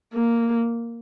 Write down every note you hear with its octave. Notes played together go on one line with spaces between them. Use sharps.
A#3